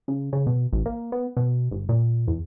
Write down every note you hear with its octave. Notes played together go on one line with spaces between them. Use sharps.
C#3
C#3
B2
A1
A#3
B3
B2
G1
A#2
E2